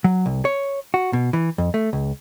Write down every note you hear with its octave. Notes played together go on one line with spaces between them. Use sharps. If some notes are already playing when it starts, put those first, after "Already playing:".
F#3
C2
C#5
F#4
B2
E3
F2
A3
C#2